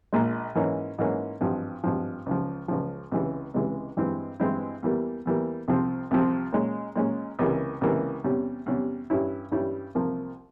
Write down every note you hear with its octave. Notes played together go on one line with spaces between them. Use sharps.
A#1 A#2 G#3
G#2 E3 A#3 C#4
G#2 E3 A#3 C#4
G#1 G2 F3
G#1 G2 F3
C#2 C#3 F3
C#2 C#3 F3
C#2 C3 E3 G#3
C#2 C3 E3 G#3
G2 E3 G#3 C4 E4
G2 E3 G#3 C4 E4
E2 E3 G3 A#3
E2 E3 G3 A#3
C2 C3 F3 C4
C2 C3 F3 C4
A#2 G#3 C#4
A#2 G#3 C#4
C#2 C3 E3 A#3
C#2 C3 E3 A#3
E2 C3 G3 C#4
E2 C3 G3 C#4
G2 G3 C#4 E4
G2 G3 C#4 E4
C2 C3 F3 A#3